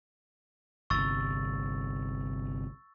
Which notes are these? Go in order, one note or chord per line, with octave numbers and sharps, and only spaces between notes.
G1 C2 C#6 E6 A6